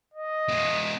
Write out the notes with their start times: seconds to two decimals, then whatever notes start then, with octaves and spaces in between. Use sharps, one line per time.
0.14 D#5
0.48 G#3 B3